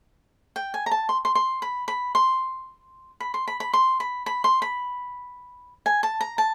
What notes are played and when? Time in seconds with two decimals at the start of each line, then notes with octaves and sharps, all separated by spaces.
0.56 G5
0.74 G#5
0.86 A#5
0.91 A5
1.09 C6
1.25 C6
1.35 C6
1.62 B5
1.88 B5
2.15 C6
3.20 B5
3.34 C6
3.48 B5
3.60 B5
3.73 C6
4.00 B5
4.26 B5
4.44 C6
4.62 B5
5.86 G#5
6.03 A5
6.21 A#5
6.38 A5